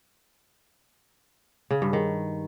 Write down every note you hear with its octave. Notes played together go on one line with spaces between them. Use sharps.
C#3
G2
D#3